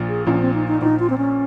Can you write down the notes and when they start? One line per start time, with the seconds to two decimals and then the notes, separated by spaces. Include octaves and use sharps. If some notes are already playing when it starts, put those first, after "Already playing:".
Already playing: A#1 A#2 F3
0.09 G#4
0.27 A#1 A#2 F3 C#4
0.40 C4
0.54 D#4
0.68 D#4
0.81 A#1 A#2 F3 D#4
1.00 F4
1.10 C4
1.18 C#4